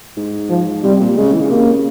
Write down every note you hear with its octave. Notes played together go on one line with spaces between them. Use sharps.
G#2
F3
C3 G3
A#2
C#3 G#3
E3
C#3
C3 A#3
C#3